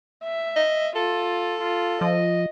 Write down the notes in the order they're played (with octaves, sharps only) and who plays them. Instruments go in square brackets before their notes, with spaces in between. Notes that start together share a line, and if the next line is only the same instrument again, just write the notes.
[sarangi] E5
[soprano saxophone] D#5
[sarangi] F4 [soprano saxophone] A4
[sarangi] F4
[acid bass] F3 [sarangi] D#5